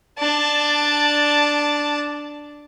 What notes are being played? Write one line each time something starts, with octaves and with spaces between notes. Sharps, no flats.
D4 A5